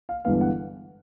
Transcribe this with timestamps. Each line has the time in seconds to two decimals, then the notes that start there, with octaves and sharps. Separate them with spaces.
0.09 F5
0.24 G1 G2 E3 G#3 B3 F5
0.41 F#5